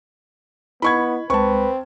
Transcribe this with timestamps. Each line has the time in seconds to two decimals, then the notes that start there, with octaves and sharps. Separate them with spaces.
0.82 B3 E4 D#5 B5 C#6 G#6
1.30 C#2 G#3 C4 B4 A5 C#6